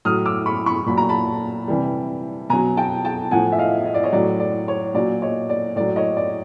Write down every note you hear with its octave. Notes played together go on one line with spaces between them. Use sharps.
A2 F#3 D#6 F6
D6 E6
B5 C#6
B5 C#6
A#2 F#3 B5
A#5
A5 B5
C3 E3 G3
B2 F#3 G#5 A#5
G5 A5
G5 A5
A2 F3 F#5 G#5
E5
D#5 F5
D#5
D5
C#5 D#5
A2 F#3 D5
D5
C#5
A#2 F#3 D5
C#5 D#5
D5
A2 F#3 D5
C#5 D#5
D5